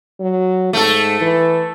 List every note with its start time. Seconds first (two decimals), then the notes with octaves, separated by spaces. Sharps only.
0.20 F#3
0.73 G#2 A3 A4
1.21 E3